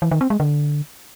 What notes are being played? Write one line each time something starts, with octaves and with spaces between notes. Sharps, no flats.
E3
D#3
C4
G#3
D3